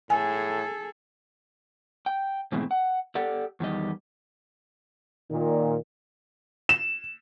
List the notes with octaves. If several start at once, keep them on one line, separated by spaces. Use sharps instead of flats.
A2 G#4 A4 G#5
G5
G#2 B2 E3 G#3 A3 C4
F#5
G4 A4 D5 F#5
E2 D#3 G3 D#5
A#2 D#3
E7